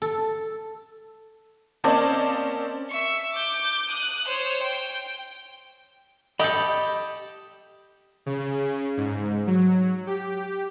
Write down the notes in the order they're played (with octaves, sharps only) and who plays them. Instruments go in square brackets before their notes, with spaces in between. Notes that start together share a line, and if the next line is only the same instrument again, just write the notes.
[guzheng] A4
[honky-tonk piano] A#3 C4 C#4 D5 D#5 A5
[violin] E5 C#6
D6 G6
D#6 F#6
C5 C#5
G5
[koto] G4 A4 [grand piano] D#5 D#6 G6 [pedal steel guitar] B5
[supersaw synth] C#3
G#2
F#3
G4